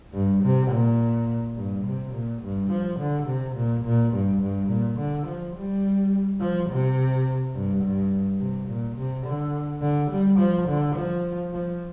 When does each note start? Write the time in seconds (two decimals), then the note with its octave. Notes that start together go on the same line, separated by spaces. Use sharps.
0.14 G2
0.43 C3
0.71 A#2
1.57 G2
1.86 C3
2.14 A#2
2.42 G2
2.70 F3
2.99 D3
3.27 C3
3.56 A#2
3.85 A#2
4.13 G2
4.42 G2
4.69 A#2
4.99 D3
5.27 F3
5.56 G3
6.40 F3
6.70 C3
7.54 G2
7.83 G2
8.40 C3
8.69 A#2
8.97 C3
9.26 D3
9.82 D3
10.11 G3
10.39 F3
10.68 D3
10.96 F3
11.53 F3